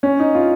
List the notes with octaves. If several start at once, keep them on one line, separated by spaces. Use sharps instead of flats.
C#4
D#4
F4